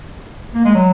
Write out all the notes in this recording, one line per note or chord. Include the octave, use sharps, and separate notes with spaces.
A#3
G#3
F#3